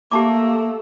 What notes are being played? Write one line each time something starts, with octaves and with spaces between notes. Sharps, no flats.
A3 A#3 G4 A4 A5 D6